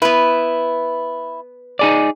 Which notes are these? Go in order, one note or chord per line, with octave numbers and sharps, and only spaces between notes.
B3 E4 B4
D#4 G#4 D5